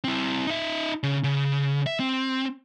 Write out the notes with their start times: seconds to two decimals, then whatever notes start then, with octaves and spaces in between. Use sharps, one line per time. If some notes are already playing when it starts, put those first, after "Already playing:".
0.04 C4 E4
0.47 D#4 E5
1.03 C#3
1.24 C#3
1.86 E5
2.00 C4